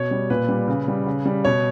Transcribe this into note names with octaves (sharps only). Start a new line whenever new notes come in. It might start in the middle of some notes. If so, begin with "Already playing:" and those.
Already playing: B2 C#5
G3
A#2 B4
G3
C#3
G3
C#3
G3
B2 C#5